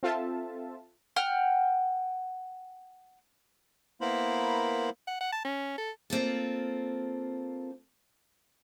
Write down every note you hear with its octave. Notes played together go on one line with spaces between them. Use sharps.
C4 F4 A4 E5 A5
F#5 G5 F6
A#3 B3 E4 A#4 C5 B5
F#5
F#5
A5
C#4
A4
A#3 C4 F4 A4